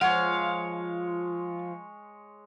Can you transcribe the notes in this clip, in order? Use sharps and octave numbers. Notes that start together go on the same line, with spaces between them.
F3 G#3 C#5 F5 F#5